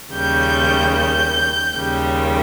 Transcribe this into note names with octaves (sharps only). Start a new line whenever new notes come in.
D#2 C#3 G3 G6
G6
D#2 C#3 G3